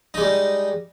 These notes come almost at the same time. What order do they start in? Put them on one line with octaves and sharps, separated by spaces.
D#4 G#3 G3